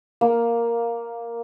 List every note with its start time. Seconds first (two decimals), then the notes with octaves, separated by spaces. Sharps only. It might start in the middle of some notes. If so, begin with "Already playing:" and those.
0.21 A#3